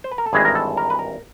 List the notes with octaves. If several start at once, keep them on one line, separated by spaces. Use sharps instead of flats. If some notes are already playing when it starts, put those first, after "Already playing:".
C5
B4
A#4
A4
G#1 G2 E3 G#3 G#4
A#4
A4
A#4
B4
A#4